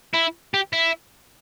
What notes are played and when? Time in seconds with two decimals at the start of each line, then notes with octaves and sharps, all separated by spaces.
0.13 E4
0.54 G4
0.73 E4